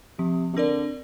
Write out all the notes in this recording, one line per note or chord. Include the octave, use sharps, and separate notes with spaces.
C3 F3
C3
D3 C4 A#4 D5